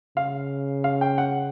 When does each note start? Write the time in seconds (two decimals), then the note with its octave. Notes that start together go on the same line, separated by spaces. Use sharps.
0.17 C#3 F5
0.84 F5
1.01 G5
1.18 F#5